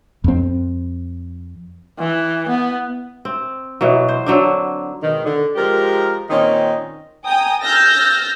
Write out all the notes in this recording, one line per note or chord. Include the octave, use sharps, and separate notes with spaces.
F2 C4
E3
B3
C4
B2 E3 F#3
C5
D3 F#3 C4 D4
G#2 B2 D#3
D3
F3 G#3 G4 A#4
A#2 D#3 C4 C#4 D#4
G5 G#5 A#5 D#6
E6 F6 G6 A6 A#6